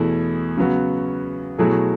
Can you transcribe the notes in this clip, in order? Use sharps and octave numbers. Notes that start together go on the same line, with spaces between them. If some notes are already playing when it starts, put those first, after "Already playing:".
Already playing: E2 B2 A3 E4 G#4
C#3 F#3 B3 F#4
B2 F#3 A3 E4 G#4